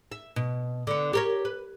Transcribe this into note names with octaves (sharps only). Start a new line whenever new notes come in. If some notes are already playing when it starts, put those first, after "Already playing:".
E5
B2
D3 B3
G4 A#4 C#5
B4